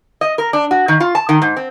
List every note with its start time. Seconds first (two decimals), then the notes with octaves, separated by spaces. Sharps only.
0.21 D#5
0.38 A#4
0.53 D4
0.71 F#4
0.88 D#3
1.00 F4
1.15 A5
1.29 D#3
1.42 G#2
1.57 C4